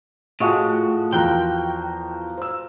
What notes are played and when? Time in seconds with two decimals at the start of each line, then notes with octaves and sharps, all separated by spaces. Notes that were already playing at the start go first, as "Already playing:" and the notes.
0.40 A2 F3 G#3 F#4
1.13 E2 F3 A#4 G5 C6 F#6
2.38 C5 E6